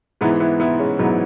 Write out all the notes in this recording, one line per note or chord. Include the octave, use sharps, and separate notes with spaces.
G#2 E3 B3 E4
B3 E4
B3 E4
G#3 C#4
G#2 E3 F#3 B3